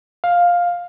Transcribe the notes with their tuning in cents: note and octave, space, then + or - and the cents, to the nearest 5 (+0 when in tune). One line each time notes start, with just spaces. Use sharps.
F5 +10